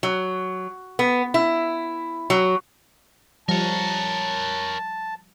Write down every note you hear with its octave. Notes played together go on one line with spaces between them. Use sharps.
F#3
B3
E4
F#3
F3 G3 A#4 C#5 A5